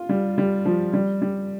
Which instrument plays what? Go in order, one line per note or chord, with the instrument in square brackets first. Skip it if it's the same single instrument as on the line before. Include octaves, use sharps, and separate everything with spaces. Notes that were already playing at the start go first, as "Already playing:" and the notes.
Already playing: [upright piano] F4
G3
G3
F3
G3
G3